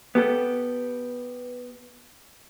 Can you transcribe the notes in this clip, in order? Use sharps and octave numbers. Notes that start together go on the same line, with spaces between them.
B3 G4 A4